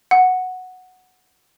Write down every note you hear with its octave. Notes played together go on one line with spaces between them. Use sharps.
F#5